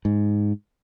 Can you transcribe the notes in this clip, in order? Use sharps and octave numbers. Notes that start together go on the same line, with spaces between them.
G#2